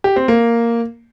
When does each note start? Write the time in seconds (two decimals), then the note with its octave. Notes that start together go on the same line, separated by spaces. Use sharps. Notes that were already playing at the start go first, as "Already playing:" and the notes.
0.04 G4
0.16 C4
0.28 A#3